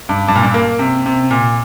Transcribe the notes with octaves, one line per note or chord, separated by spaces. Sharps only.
G2
G2
A#2
G2
A#3
C3
C3
A#2